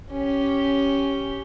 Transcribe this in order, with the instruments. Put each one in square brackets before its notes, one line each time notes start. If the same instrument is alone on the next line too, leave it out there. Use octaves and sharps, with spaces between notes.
[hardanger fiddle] C#4 G4